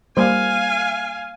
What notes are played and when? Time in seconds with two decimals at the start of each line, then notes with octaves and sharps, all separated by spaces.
0.17 G3 A#3 C5 F5 G#5